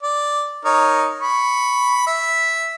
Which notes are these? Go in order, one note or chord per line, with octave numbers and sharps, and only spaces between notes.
D5
D#4 A#4 C#5
B5 C#6
E5